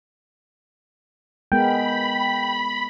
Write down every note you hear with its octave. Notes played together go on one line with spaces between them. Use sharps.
G#3 B3 A#4 G5 B5